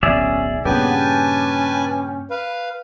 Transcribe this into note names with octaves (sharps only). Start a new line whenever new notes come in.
D1 B1 C#4 G#4 D5 E5
G2 A#2 C#3 B3 G4 B4 G#5 A5
C#4
B4 F5